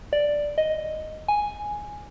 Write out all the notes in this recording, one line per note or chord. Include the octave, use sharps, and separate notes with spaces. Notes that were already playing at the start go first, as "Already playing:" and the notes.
D5
D#5
G#5